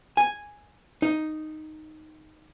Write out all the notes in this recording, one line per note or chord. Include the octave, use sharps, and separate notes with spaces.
G#5
D#4